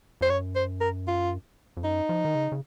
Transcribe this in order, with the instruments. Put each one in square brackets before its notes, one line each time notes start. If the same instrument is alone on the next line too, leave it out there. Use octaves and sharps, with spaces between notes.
[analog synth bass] F2 [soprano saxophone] C5
[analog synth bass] F#2 [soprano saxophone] C#5
[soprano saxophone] C5
A#4
F4
[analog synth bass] F2
[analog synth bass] F#2 [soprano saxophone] D#4
[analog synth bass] F3
D#3
C#3
C#3